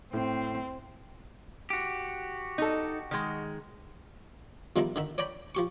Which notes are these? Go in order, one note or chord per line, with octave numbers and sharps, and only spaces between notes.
A2 C4
F#4 G4
D#4 A4
D#3 G#3
E2 D#3 F3 G3 E4 A#5
D3 D#3 E5
C#5 D5 G5 A#5 B5
F3 G4 C#6